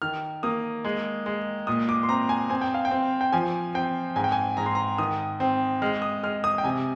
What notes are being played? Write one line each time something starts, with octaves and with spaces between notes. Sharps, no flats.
D#3 F6
A#3 D#6
G#3
G#3
A#2 D#6
D6
C6
C4 A#5
G#5
C4 G#5
G5
F5
G5
C4
G5
F3 G#5
C4 G5
G#2 G#5
G5
G#5
G#2 A#5
C6
A#5
D#3 D#6
C4
G#3 F6
D#6
G#3 F6
D#6
G5
C3 G#5